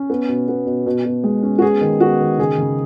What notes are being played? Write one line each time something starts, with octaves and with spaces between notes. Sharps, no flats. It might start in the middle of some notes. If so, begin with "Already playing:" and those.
Already playing: C#4
B3
B2
B3
B2
B2
B2
G#3
C#4
F#4
B3 G#4
D#3
B3 F#4
D#3
C#3 G#4
C#3